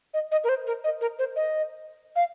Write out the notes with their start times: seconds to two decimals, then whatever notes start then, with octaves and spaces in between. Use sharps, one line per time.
0.14 D#5
0.32 D#5
0.44 A#4
0.49 C5
0.67 A#4
0.84 D#5
1.01 A#4
1.19 C5
1.36 D#5
2.16 F5